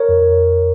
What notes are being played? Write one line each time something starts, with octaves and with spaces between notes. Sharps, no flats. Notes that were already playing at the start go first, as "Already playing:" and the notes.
Already playing: A#4 C#5
F2